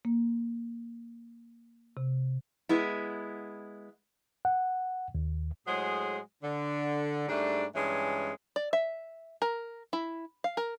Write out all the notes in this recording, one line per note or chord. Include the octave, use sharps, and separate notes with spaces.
A#3
C3
G#3 B3 E4
F#5
D#2
A2 F#3 G#3 G#4 C5
D3
G#2 G3 A3 D4
G2 E3 G#3 C#4
D5
E5
A#4
E4
F5
A#4